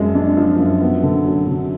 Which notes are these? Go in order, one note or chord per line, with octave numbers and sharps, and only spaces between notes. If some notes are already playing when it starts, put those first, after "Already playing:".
Already playing: F#2 F3 G#3
D4
F3
F#2
B3
D3
F#3
D3